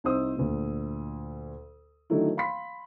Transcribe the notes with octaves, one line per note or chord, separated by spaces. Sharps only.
C2 D#4 C5 D#6 E6
D2 A#2
D3 D#3 F#3 A3 D#4 E4
F5 B5 C6 B6